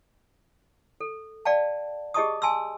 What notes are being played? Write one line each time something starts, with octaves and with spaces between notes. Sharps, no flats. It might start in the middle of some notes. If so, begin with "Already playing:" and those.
A4
D5 F5 G5 A5
G4 G#4 D#5 A5 C#6 D#6
G#5 A5 C6 E6